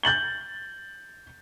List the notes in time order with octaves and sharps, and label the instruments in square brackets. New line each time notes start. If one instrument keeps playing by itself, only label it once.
[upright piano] G6 A6 F#7 G7